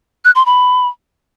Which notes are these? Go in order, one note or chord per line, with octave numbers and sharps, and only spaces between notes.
F#6
C6
B5